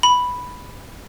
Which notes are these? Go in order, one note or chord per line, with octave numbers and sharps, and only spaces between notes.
B5